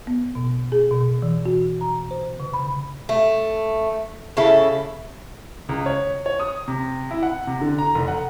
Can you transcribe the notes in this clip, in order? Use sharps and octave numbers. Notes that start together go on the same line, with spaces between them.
B3
B2
G#4
B2
E3
F#4
A#5
C5
C#3
B5
A3
C#3 E4 A4
C#2
C#5
C#5
D#6
C3
E4
F#5
C3
D3
A#5
F1
F#5